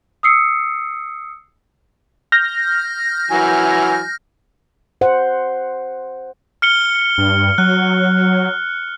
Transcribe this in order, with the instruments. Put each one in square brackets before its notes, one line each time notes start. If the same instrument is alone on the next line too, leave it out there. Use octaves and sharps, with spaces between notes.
[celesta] D#6 E6 C7 C#7
[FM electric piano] F6 G6 A#6
[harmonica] E3 F#3 G#5
[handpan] C5 F#5
[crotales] F6 C#7 G7
[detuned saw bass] G2
[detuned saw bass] F#3 [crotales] F#6